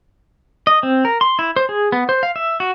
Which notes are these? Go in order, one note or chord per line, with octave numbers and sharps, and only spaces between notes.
D#5
C4
A#4
C6
E4
C5
G#4
B3
C5
F5
E5
F#4